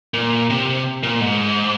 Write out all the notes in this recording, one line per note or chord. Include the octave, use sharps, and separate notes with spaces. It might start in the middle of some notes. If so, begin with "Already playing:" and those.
A#2
C3
A#2
G#2